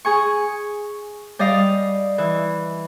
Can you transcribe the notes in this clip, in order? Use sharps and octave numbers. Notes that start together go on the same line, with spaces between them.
G#4 G#5 C#6
G3 D5 D#5 F5
E3